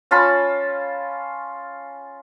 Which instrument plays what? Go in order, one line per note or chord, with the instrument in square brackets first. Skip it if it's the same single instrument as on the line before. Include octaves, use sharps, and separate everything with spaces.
[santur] C#4 F4 A5 B5